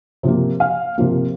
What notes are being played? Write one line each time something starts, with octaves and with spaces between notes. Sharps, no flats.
C3 F3 A#3
F5
C3 F3 A#3